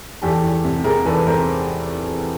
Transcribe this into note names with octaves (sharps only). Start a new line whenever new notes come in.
E2 G4 A4
E2
C3
C3 G#4 A#4
E2 A4 B4
C3 A#4 C5